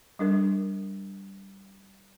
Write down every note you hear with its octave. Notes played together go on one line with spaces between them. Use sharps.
G3 D4 A#4